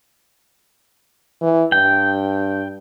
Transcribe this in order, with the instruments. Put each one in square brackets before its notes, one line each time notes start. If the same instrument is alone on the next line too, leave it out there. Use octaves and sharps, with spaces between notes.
[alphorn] E3
[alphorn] G2 [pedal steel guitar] G5